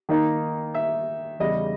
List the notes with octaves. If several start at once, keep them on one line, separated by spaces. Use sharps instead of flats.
D#3 A#3 D#4
E5
E2 C#3 G3 D#5